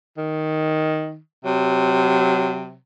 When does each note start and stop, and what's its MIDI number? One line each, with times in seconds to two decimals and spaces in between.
0.18 1.19 51
1.45 2.78 48
1.45 2.75 54